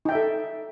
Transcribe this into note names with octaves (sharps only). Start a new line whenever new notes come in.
D#4 A4 E5 G5